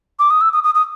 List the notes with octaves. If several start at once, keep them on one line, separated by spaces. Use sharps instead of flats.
D6
D#6
E6
D#6
D#6
D#6